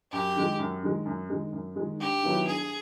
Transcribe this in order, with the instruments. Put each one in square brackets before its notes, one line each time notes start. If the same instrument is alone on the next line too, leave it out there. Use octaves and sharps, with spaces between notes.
[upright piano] F#2 [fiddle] G4
[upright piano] D#3 G#3
F#2
D#3 G#3
F#2
D#3 G#3
F#2
D#3 G#3
[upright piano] G2 [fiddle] G4
[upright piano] D#3 F#3 B3 E4
[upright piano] G2 [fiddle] G#4